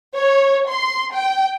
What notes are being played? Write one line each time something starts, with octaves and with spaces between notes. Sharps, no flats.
C#5
C6
G5